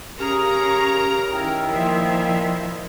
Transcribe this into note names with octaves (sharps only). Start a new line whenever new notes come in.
C#3 C#4 G4 G#4 A#4 A#5 C#6
D#3 E4 G5
A#2 F3 E5